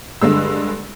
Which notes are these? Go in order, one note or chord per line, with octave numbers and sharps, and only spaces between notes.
G2 D3 G#3 E6